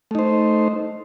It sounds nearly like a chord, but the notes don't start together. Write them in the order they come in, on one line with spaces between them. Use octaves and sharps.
A3 D#4 C5